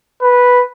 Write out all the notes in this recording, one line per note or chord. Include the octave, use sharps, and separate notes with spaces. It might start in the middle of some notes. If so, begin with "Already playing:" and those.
B4